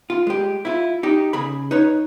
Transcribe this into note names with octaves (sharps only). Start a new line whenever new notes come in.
F4
G#3 G4
E4 F4
D#4 G4
C#3 G#4 B5
D#4 B4 C#5